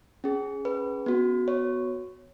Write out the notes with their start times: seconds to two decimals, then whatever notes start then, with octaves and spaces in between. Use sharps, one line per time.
0.24 C#4 G#4
0.65 B4
1.06 B3 F#4
1.48 C#5